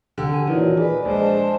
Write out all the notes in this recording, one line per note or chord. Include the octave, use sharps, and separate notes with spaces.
D3 G4
G#5
A#2 D#3 E3 F#3
G#4 B4 D5
A#1 G#3 D4 C5
A5